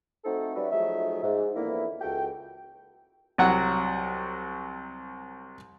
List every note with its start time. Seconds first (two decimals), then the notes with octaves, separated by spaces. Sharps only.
0.24 A3 C4 D#4 F#4 A4 C5
0.55 G3 C#4 F#4 B4 D5 E5
0.71 F3 F#3 A3 D#4 G#4 E5
1.23 G#2
1.56 F2 E3 A#3 B3 D4 E4
2.01 C#2 F#4 A4 G5
3.38 C2 F#3 F#5